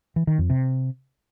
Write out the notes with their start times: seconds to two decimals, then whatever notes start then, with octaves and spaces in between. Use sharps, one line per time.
0.16 E3
0.27 D#3
0.39 F2
0.50 C3